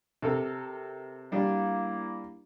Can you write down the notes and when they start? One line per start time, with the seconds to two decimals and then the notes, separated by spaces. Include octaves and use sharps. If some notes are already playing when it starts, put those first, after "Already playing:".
0.22 C3 A4 A#4
1.32 G3 A#3 D4 E4